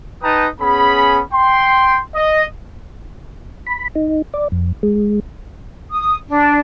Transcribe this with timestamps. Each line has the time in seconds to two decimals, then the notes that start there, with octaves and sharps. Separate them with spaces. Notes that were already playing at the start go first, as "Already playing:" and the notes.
0.22 D#4 B4 G5 A5 A#5 D#6
0.61 B3 C#4 G#4 B5
1.33 G5 C6
2.14 D#5
3.67 B5
3.95 D#4
4.34 D5
4.52 F2
4.83 G#3
5.92 D#6
6.29 D4